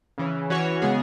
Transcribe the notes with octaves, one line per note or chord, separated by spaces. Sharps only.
C#3 E3 C#4
E3 C#4 F#4 C#5
C#3 G#3 B3 G#4